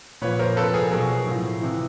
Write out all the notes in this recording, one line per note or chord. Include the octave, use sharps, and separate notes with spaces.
A#2 F3 B4 C#5
A#4 C5
C3 F3 A4 B4
G#4 A#4
B2 F#3 G#4 A#4
A2 F3
C3 E3